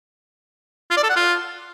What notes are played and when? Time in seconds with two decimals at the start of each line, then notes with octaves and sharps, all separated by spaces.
0.91 F4
0.97 D5
1.03 A4
1.09 F#5
1.16 F4